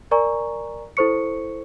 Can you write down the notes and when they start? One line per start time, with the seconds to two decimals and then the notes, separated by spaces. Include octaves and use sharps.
0.11 A#4 D5 G#5 A#5 C#6
0.97 E4 A4 C5 C#6 C#7